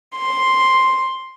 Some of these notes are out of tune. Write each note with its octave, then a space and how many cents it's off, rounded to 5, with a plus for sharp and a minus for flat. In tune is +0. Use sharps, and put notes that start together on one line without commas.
C6 +5